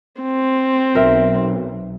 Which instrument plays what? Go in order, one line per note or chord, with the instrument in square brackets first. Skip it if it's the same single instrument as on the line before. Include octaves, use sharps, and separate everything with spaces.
[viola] C4
[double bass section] B1 [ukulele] A#4 E5